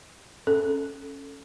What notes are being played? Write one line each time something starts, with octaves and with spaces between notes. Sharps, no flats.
C#4 A4